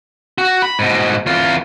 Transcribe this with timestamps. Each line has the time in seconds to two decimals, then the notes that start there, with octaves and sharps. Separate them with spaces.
0.38 F#4
0.62 B5
0.79 G#2 B2
1.26 E2 F4